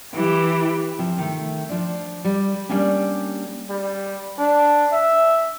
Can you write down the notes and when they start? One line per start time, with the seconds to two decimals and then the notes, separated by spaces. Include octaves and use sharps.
0.14 E3 G4
0.99 C3 F3
1.18 D#3 A3
1.69 F3 D4
2.25 G3
2.69 G3 A#3 C#4 D4
3.70 G3
4.39 D4
4.92 E5